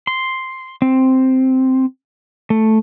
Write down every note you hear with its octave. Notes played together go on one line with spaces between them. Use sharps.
C6
C4
A3